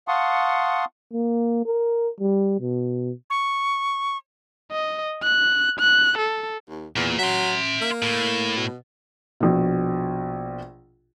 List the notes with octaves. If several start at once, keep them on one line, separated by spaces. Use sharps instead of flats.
F5 F#5 A5 C6 C#6 D#6
A#3
A#4
G3
B2
C#6
D#5
F#6
F#6
A4
D#2
E2 A#2
F#3 E5 C6
A#3
A2
B2
A#1 B2